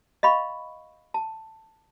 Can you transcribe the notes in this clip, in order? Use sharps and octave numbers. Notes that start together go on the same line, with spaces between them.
D#5 F5 B5 C#6
A5